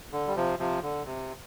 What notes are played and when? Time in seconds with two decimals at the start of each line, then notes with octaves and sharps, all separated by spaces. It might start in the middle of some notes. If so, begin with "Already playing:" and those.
0.12 D3
0.27 G3
0.36 C3 F3
0.59 C3 F3
0.82 D3
1.05 C3